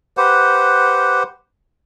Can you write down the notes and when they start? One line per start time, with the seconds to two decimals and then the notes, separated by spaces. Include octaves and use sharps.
0.17 G4 B4 C5 F#5